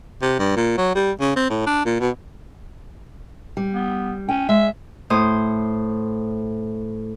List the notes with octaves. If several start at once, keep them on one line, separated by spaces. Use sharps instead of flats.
C3
G2
A#2
F#3
G3
C#3
C4
A2
D4
A#2
B2
G3
B3
C#4 G5
G#3 E5
A2 C5 D#6